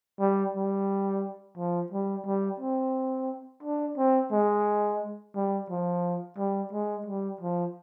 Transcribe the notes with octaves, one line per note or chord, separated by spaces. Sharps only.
G3
G3
F3
G3
G3
C4
D4
C4
G#3
G3
F3
G3
G#3
G3
F3